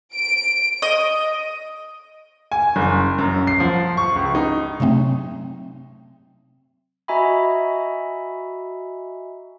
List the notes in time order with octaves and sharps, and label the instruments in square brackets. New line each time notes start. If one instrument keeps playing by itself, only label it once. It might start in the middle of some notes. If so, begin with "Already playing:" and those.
[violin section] D7
[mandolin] D#5
[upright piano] G#5
F#1
F#2
C7
F3
C#6
C#2
D#4
[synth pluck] C3 F#3 A3 C4
[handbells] F#4 D#5 E5 G#5 A#5 B5